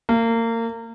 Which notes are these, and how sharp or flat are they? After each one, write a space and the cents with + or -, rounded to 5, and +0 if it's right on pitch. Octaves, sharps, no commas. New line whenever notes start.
A#3 -30